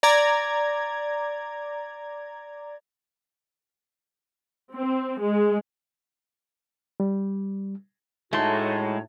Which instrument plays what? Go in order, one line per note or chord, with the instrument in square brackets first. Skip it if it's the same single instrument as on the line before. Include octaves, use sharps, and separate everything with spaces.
[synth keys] D5 A#5 G#6
[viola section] C4
G#3
[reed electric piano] G3
[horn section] A2 [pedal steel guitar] G#3 E4 C6 [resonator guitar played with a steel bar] A3 [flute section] D#4 F#4 C#5